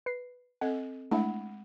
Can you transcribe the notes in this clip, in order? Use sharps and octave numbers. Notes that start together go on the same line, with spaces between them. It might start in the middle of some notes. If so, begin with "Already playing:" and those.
B4 C7
C4 A4 D#5 F#5
G#3 A3 D4 E4 F#5 B5